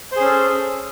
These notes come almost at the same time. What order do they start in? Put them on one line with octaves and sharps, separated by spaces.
C5 G#4 C#4 A4